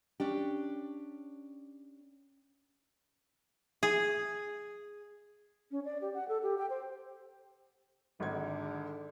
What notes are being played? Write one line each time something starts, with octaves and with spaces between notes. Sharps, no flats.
C#4 D4 G4
G#4
C#4
D5
G4
F#5
A4
G4
G5
C5
G#1 G#2 D3 G#6